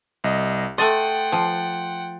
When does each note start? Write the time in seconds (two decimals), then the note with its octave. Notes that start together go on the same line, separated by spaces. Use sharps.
0.24 C2 D#5
0.78 A3 D#5 F#5 G5 C6 A6 D#7
1.32 F3